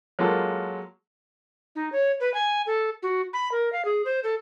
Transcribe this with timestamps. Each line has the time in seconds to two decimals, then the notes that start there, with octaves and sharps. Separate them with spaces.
0.19 F#3 G#3 A#3 F4 A4
1.76 D#4
1.92 C#5
2.20 B4
2.34 G#5
2.67 A4
3.03 F#4
3.33 B5
3.52 A#4
3.73 F5
3.85 G#4
4.05 C5
4.24 A4